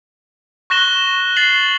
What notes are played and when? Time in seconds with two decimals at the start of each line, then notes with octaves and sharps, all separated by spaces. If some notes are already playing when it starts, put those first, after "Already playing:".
0.70 C#6 F#6 A#6 E7 G7
1.36 A6 C7 F#7